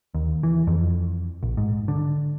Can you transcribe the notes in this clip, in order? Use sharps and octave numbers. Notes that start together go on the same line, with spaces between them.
D#2
E3
F2
A#1
G#2
D3